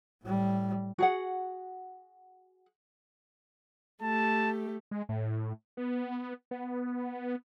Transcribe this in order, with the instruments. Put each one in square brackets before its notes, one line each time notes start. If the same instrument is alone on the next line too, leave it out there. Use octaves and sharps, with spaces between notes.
[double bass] A2 G3
[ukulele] F#4 G#4 F#5
[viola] A3 G4 [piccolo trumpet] A5
[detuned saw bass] G#3
A2
B3
B3